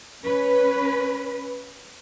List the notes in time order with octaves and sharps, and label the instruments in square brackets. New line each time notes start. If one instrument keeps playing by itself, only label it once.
[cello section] C#4 B4